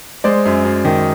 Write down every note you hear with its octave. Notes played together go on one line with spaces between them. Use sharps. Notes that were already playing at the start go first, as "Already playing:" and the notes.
G#3 C5 D5
F#2
F#2
D#3